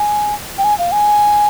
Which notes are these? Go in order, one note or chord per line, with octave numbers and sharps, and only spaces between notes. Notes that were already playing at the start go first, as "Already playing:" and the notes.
Already playing: G#5
G5
G#5
F5
G#5